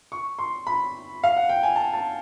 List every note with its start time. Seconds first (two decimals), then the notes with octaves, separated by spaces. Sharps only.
0.12 C#6
0.39 C6
0.67 B5
1.24 F5
1.37 F#5
1.49 G5
1.63 G#5
1.76 A5
1.94 A5